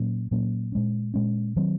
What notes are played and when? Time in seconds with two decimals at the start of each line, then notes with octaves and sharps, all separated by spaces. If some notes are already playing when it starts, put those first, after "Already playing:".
Already playing: A#2 F#3 A#3 C#4
0.31 A#2 F#3 A#3 C#4
0.72 A#2 G#3 C#4
1.14 A#2 G#3 C#4
1.56 D#3 F#3 C4